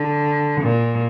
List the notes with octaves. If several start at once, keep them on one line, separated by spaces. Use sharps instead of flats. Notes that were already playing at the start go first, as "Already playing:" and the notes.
Already playing: D3
A#2